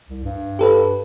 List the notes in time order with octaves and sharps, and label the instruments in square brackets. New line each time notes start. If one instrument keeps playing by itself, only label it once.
[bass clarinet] C2
G2
[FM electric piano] G4 A4 B4